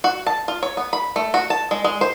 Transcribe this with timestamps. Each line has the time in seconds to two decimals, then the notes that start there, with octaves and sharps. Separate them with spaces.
0.04 F#4
0.27 A5
0.48 F4
0.63 C#5
0.77 B3
0.93 B5
1.16 A3
1.34 F#4
1.50 A5
1.71 G#3
1.84 G#3
2.01 C5